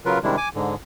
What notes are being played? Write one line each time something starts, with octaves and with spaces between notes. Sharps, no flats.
C#3 F#3 F4 A#4 B4
C3 D#3 G3 G#3 D4 E4
G#5 D6
G#2 D3